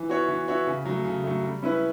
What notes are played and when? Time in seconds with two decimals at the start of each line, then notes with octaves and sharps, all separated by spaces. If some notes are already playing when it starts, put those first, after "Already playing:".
Already playing: E3
0.09 B3 F#4 C#5 E5
0.28 E3
0.48 B3 F#4 C#5 E5
0.67 C#3
0.85 F#3 A3
1.05 C#3
1.24 F#3 A3
1.43 G3
1.62 C#4 E4 B4